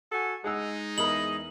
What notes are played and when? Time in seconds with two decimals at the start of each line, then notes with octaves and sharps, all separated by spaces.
0.12 F#4 A4 G#5
0.44 G#3 D#4 G#4 F#5 E6
0.98 E2 A#4 D#5 B5 F#7